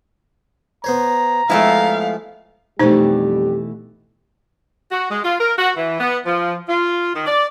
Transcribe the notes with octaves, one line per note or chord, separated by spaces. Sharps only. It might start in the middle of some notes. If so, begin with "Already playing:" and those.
B3 C5 C#5 A#5
F3 G#3 A3 B3 E4 F5
F2 B2 E3 G3 A3 D#4 G4 C5
F#4
G#3
F4
A#4
F#4
E3
B3
F3
F4
D#3
D5